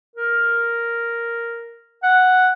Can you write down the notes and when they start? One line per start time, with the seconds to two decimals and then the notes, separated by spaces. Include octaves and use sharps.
0.16 A#4
2.03 F#5